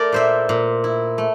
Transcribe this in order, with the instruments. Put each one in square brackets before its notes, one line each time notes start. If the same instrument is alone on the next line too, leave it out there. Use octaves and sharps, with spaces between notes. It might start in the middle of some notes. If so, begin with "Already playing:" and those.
Already playing: [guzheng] A3 E4 A#4 D5
A#2 C5 E5
A#2
E4
A3